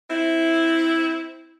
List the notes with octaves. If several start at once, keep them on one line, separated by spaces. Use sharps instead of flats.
C4 E4